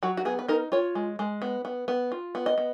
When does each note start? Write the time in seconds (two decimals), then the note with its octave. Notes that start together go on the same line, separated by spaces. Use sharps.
0.03 F#3 F#4
0.17 F#4
0.25 B3 G#4
0.39 B4
0.48 D#4 A#4
0.72 F4 C#5
0.95 G#3
1.19 G#3
1.42 B3
1.65 B3
1.88 B3
2.12 F4
2.35 B3
2.46 D#5
2.58 B3